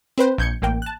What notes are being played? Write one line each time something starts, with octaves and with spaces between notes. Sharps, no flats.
C4 B4 C5
A#1 G6 G#6 C#7
A1 A#3 G5
A5 F#6